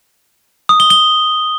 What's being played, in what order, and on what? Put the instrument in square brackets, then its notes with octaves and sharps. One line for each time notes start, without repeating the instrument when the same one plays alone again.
[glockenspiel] D#6
G7
G7